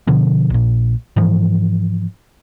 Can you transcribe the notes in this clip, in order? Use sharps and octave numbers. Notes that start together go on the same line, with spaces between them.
B2 D3 F3
A#1 A#2
G#2 E3 F3